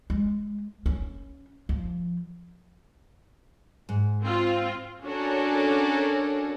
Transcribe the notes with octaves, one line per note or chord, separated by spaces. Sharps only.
G#3
C#4
F3
G#2
C4 F4
C#4 D4 F#4 A4 A#4 C#5